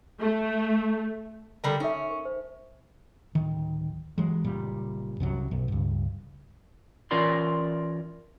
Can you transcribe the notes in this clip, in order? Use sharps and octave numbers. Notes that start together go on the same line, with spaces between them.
A3
D3 G3 A#4 A5 B5 E6
C#4 D#4 A4 E5
A#4 C#6
C5
D1 D#3
E3 F#3 G#3
F#1 A#2 G3
C2 F#2 F#3
B1
C#2 G2
E3 C#4 F4 A#4 D5 C6